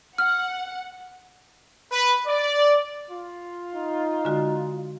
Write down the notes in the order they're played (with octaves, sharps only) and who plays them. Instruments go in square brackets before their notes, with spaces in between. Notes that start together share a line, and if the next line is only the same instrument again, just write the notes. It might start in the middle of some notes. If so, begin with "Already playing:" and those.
[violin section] F#5 [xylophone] F6
[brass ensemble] B4
D5
[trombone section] F4
[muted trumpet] D#4
[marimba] D3 G#3 F#4